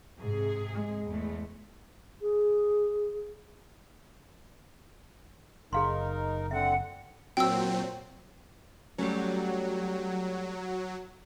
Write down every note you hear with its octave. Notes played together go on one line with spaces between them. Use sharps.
G#2 C3 G#4
G#3
E2 A3
G#4
F#1 D#4 G#4 A#4 F5 C6
D3 C4 E5 F#5
A#2 F#3 C4 G5 E6
F#3 G3 A3 C#4